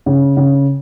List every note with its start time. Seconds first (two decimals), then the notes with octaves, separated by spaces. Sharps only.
0.06 C#3
0.37 C#3